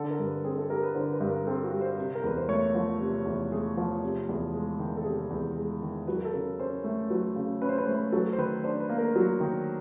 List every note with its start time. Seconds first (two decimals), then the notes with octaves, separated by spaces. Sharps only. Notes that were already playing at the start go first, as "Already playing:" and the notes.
Already playing: D3 A4
0.10 A#4
0.19 G2
0.27 B4
0.44 C4 G#4
0.58 A4
0.70 G3 A#4
0.83 B4
0.95 D3 C5
1.12 B4
1.20 G2
1.30 A#4
1.47 C4 A4
1.64 F#4
1.72 G3
1.81 C5
1.98 C3
2.15 A#4
2.23 E2 B4
2.37 C5
2.49 A3 C#5
2.75 F3
3.00 C3
3.25 E2
3.51 A3 G#4
3.77 F3
4.03 C3
4.29 E2
4.53 G#3
4.79 D#3
4.97 A4
5.05 C3 G#4
5.30 E2
5.57 G#3
5.82 D#3
6.07 F#3 B4
6.17 A#4
6.25 A4
6.33 C#3 A#4
6.59 C#4 C5
6.84 A3
7.10 F#3 B4
7.36 C#3
7.62 C#4 B4
7.69 C5
7.78 B4
7.86 A3 C5
7.94 B4
8.12 F#3 A4
8.33 C5
8.38 D#3 B4
8.64 D4 C5
8.80 B4
8.89 A#3
8.98 A#4
9.16 F#3
9.40 D#3